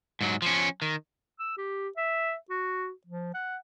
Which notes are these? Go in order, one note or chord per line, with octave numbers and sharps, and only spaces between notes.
G#2 F#3
F3 C#4
D#3
E6
G4
E5
F#4
F3
F#5